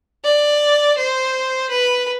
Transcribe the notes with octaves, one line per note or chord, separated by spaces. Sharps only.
D5
C5
B4